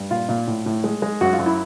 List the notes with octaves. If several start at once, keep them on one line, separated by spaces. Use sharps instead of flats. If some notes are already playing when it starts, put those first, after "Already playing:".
Already playing: G2
A#2 F4
A#2
A2
A2
G#3
G#3
F#2 F#4
F4
F#2
E4